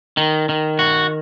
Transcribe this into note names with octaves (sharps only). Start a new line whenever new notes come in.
D#3
D#3
F#4